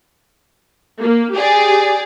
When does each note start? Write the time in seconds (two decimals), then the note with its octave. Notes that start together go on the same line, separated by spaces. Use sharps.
1.02 A#3
1.35 G4 G#4 D5